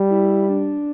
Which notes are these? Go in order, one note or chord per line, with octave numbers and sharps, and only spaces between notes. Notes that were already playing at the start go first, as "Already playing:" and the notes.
Already playing: G3
E4
D4